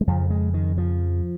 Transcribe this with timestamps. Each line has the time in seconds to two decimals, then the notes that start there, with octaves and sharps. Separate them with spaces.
0.01 G#3
0.07 F2 C#3 F3
0.30 G#3
0.54 D#3
0.78 F3